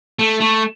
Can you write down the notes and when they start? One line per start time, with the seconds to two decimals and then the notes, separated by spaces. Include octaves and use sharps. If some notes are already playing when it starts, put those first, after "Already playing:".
0.19 A3
0.40 A3